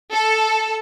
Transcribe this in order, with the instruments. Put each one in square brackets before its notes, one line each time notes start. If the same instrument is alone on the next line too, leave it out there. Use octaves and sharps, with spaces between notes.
[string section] A4